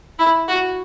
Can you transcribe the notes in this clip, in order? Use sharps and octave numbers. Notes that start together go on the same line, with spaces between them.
E4
F#4